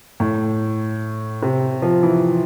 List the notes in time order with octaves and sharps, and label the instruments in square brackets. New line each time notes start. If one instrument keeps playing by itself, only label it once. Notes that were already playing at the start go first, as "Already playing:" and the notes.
[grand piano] A2
C3
F3
E3